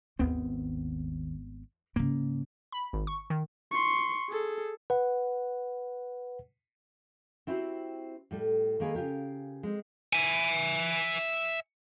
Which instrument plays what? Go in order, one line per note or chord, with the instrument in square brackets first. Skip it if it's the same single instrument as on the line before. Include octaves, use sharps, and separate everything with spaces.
[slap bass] G#1 B3 C4 [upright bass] D#2
[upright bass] G#2 C#3 [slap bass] A#3
[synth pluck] B5
G#1
C#6
D#3
[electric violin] C6 C#6
G#4 A4
[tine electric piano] B4 F#5
[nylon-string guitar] C4 E4 F#4 G4 C5
A2 G3 A4
D#3 A#3 G#4 A4 B4
C#3 F4 G4 A#4
G#3 C4
[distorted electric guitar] E5 G#5